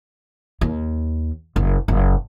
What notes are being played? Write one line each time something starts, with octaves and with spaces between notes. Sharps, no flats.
D#2
F#1
F#1